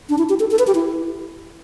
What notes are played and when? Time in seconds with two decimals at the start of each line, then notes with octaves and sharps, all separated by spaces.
0.10 D4
0.18 E4
0.29 G4
0.40 A4
0.51 A4
0.59 B4
0.67 G4
0.75 E4